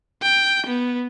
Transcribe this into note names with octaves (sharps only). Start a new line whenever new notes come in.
G5
B3